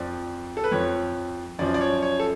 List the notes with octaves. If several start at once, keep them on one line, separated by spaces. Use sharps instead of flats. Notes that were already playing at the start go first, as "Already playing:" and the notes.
Already playing: F2 F3 D5
A4
B4
F2 F3 C#5
F#2 F3 D5
D5
C#5
C#5
A4